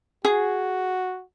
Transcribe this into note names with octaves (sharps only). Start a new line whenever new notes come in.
F#4 G#4